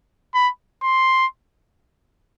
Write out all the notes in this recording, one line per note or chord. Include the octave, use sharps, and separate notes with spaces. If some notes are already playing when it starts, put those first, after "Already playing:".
B5
C6